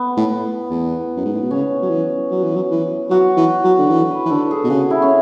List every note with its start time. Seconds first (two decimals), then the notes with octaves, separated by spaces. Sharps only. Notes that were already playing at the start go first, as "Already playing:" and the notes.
Already playing: B3
0.17 A2
0.71 E2
1.16 F#2
1.25 G#2
1.34 A2
1.42 B2
1.51 C#3 C#4
1.83 F#3
1.90 E3
2.31 F#3
2.44 E3
2.56 F#3
2.71 E3
3.10 F#3 F#4
3.37 E3
3.64 F#3
3.79 D3
3.90 E3
4.10 B4
4.26 E3
4.30 D3 A4
4.51 G#4
4.64 B2
4.70 C#3 F#4
4.91 E4
5.02 C#4